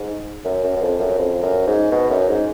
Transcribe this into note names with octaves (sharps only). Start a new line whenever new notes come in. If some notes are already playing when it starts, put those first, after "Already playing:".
Already playing: G#2
F#2
F#2
F#2
F2
F#2
F2
F#2
G#2
B2
F#2
G#2